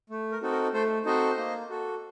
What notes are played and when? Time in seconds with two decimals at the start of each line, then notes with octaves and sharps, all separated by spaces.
0.10 A3
0.32 A#4
0.42 C4 D#4 F#4 A4
0.52 A#4
0.73 A3 A4 C5
1.05 C4 D#4 F#4 A4 C5 D#5
1.38 A#3
1.70 F#4 A4